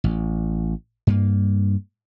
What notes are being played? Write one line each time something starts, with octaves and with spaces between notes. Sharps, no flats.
A1
G2 A#3